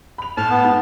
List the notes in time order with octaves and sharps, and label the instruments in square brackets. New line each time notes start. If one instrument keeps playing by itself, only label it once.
[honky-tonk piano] B5 F7
[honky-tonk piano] A2 [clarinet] A5 [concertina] F6
[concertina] B3
[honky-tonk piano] G#2